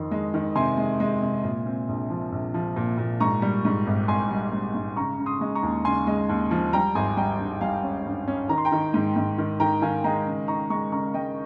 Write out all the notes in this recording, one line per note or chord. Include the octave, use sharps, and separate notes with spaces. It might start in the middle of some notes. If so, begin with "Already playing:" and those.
Already playing: F2 D#3 C6
G#3
D#3
C3 G#5 C6
G#3
G#3
C3
A#2
C4
A#1
F3
A#1
F3
A#2
A#2
G#2 A#5 C#6
G3
G#2
G#1
G#1 G#5 C6
G3
G#2
G#2
C#3 A#5 C#6
C#3
C6 D#6
G#3
A#5 C#6
D#2
C#3 G#5 C6
G#3
D#2
F3
G3 G5 A#5
G#1 G#5 C6
G3 G5 A#5
G2
G3 F5 G#5
C#4
G2
C#4
D#3 A#5
C6
G5 A#5
D#3
G#2
G#2
D#3
D#3 G5 A#5
D#3 F5 G#5
G#3 G5 A#5
C#3
D#4 A#5 C#6
G#3 A#5 C#6
C#3 A#5 C#6
G#3 D#5 G5